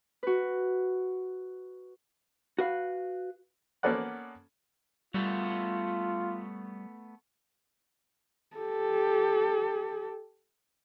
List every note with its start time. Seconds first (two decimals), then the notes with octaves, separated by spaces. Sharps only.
0.23 F#4 B4
2.59 F#4 B4 F5
3.83 A#3 B3 C#4 A4 D5 F#5
5.14 G3 A3 B3 F4 F#4
8.57 G4 A4